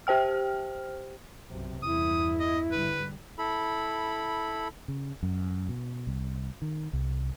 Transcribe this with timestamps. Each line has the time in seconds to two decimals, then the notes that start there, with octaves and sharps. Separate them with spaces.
0.07 G4 C5 G5 F6
1.49 B1 F#2 C3
1.83 E2 G2 E4 D#6
2.40 D#5
2.72 G#1 D3 G3 B4
3.38 E4 A4 B5
4.88 C#3
5.23 F#2
5.69 B2
6.07 C2
6.62 D#3
6.93 C2